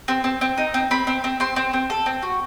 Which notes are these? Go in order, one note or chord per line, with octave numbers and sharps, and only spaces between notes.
C4
C4
C4
D#4
C4
C4 B5
C4
C4
C4 C6
C4
C4
A4
C4
F#4